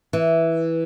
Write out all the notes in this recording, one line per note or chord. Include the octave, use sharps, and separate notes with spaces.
E3